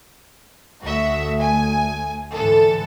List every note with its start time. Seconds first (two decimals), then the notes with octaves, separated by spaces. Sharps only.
0.83 D2 A3 F#4 E5
1.40 G#5
2.33 G#2 D3 E3 A4